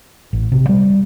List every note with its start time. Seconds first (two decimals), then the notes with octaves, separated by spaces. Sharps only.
0.33 A1
0.52 C3
0.69 G3